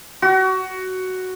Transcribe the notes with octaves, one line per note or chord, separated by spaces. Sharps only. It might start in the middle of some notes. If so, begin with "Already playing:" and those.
F#4